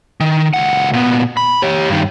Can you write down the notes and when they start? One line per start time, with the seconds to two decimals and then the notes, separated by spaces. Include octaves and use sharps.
0.20 D#3
0.54 C#2 F#5
0.93 A#2 B3
1.37 B5
1.62 G4 C#5
1.89 G2 D#3